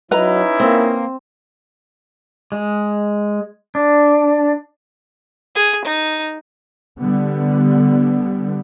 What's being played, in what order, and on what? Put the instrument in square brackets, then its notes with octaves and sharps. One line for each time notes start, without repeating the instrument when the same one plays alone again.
[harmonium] F#3 [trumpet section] C#4 D#4 E4 [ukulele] B4 D#5 A#5
[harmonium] A#3 [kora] C4
[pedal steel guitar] G#3
D4
[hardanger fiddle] G#4
D#4
[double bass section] D3 G3 B3